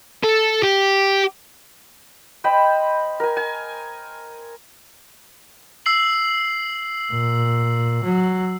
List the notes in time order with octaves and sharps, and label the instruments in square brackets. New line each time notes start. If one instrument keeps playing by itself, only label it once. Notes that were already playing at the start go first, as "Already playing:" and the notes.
[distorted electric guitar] A4
G4
[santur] C5 D#5 G5 B5
A#4 G#5
G#5
[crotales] E6 C7 F#7
[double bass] A#2
F#3